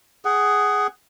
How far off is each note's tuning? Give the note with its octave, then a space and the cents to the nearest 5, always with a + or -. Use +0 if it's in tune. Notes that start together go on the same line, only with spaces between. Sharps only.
G#4 +0 F#5 +20